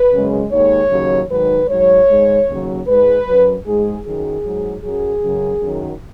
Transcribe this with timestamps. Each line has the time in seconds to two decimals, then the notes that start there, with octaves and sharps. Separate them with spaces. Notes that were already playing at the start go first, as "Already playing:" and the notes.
Already playing: B4
0.12 F#2 C#3 G#3
0.52 D#2 D#3 G#3 C#5
0.91 D#2 C#3 F#3
1.30 G#2 D#3 F#3 B4
1.69 G#2 F#3 C#5
2.08 G#2 G#3
2.48 D#2 C#3 F#3
2.87 G#2 G#3 B4
3.26 F#2 F#3
3.66 G#2 G#3 G#4
4.05 F#2 D#3 F#3 G#4
4.45 G#2 F#3
4.83 F#2 F#3 G#4
5.23 F#2 C#3 F#3
5.62 F#2 D#3 F#3